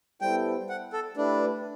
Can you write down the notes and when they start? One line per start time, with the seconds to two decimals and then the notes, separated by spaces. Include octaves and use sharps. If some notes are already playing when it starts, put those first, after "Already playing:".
0.21 G3 B3 E4 A4 C5 G5
0.69 F#5
0.93 A4
1.16 A3 D4 E4 G4 B4